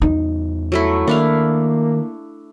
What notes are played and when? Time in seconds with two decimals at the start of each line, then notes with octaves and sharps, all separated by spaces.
0.02 E2 G3 D#4
0.72 F#3 A3 E4
1.07 D#3 A#3 D4 E4 F5